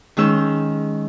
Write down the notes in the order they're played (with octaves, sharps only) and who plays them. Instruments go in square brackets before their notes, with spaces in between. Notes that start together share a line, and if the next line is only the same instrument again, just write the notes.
[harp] D#3 G#3 C#4 E6 G6